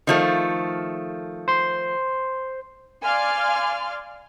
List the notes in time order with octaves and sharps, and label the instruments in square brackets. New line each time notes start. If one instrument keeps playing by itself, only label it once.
[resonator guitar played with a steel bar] D#3 F3 A3
[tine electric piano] C5 C6
[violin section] D5 F5 G#5 C6 F6